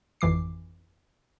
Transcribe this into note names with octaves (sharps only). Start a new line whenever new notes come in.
G#1 F2 E3 D6 C7